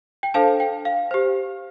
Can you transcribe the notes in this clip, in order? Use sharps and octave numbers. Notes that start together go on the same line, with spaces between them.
G5
D4 A4 C5 F5 A5
G5
F5
G4 C5